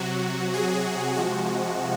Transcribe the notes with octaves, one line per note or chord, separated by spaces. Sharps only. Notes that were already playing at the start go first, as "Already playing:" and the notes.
Already playing: C3 F#3 F#4
G#4
C3 F3 G#3 F#4